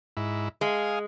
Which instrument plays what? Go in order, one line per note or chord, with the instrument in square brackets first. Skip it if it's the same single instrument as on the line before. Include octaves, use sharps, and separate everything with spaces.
[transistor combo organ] G#2 E4
[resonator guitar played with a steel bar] G#3 [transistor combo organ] F5 G#5 D#6